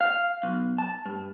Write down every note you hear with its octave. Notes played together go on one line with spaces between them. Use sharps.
F5
B1
A5
G2